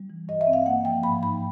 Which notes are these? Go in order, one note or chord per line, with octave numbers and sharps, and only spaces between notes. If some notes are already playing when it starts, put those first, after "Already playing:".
Already playing: G3
E3
G2 D#5
E5
C4
F5
A#3 F#5
F3 G5
G#2 B5
D#4 B5